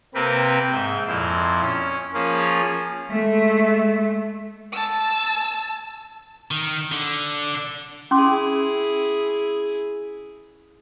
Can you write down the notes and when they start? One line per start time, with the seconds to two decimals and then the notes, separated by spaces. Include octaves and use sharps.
0.15 C3 A#3 C4 G4 A#4 B4
0.72 G#2 E5 G6
1.08 F2 A#2 E4 C6
1.61 C#4
2.14 F3 A#3 C#4 F4 G#4
3.11 G#3 A3
4.72 A5 E6
6.51 D#3
6.92 D3
8.11 C#4 E4 G#4 C6 D6